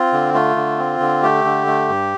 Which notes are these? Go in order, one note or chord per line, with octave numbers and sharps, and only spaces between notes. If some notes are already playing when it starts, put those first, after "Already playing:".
Already playing: C4 F4
D3
A3 F4
D3
C4
D3
A3 G4
D3
A3
G2